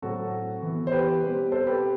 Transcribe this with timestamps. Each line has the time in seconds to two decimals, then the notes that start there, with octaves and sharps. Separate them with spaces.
0.02 A2 F#3 C4 F#4 A4
0.62 E3 B3
0.87 C5
0.92 G4 B4
1.22 B2 G3 C4
1.52 A4 C5
1.67 G4 B4